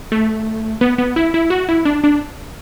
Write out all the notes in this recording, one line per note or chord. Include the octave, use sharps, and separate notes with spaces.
A3
B3
B3
E4
E4
F#4
E4
D4
D4